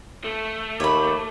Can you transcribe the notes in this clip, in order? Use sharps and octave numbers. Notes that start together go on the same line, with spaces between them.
A3
D#2 C#5 B5 D6